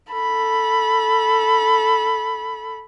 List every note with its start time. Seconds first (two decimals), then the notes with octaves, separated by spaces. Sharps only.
0.12 A4 B5